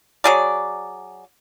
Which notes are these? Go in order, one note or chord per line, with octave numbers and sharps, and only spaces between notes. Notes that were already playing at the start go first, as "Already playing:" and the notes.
F#3 G#4 D5